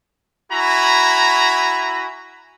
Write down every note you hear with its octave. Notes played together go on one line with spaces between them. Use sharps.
E4 F#4 G#5 A#5 B5